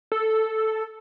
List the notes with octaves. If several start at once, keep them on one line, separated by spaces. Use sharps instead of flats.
A4